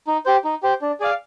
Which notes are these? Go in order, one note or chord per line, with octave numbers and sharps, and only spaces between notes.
D#4
G4 C5
D#4
G4 C5
D4
G#4 D5 F5